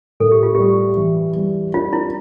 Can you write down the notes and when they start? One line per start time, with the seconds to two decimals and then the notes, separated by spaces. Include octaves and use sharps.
0.20 A2 A4
0.32 G4
0.43 F4
0.55 G3 G4
0.97 E3
1.36 G3
1.74 D4 F4
1.93 E4